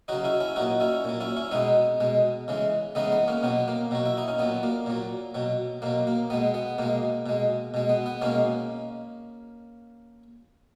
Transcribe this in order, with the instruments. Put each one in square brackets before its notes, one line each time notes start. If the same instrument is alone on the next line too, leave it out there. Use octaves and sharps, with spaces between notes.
[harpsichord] C#3 F#3 D#4 F#4
C#4 E4
C#4 E4
A#2 F#3 D#4 F#4
C#4 E4
A#2 F#3
C#4 E4
C#4 E4
B2 G#3 B3 D#4
B2 G#3
C#3 E3 G#3
C#3 E3 G#3 B3 D#4
B3
A#3 C#4
B2 F#3 B3
A#3
B2 F#3 F#4
E4
D#4
C#4
A#2 F#3 B3
A#3
A#2 F#3
B2 F#3
B2 F#3 A#3
A#3
B2 G#3 B3
B3
B2 G#3 A#3
B2 G#3
B2 G#3
B3
B3
B2 G#3 A#3 C#4